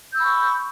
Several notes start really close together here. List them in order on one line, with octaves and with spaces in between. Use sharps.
G6 E6 B5 C#6